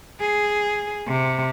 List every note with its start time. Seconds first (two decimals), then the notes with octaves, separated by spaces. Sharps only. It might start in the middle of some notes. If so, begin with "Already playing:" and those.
0.21 G#4
1.08 C3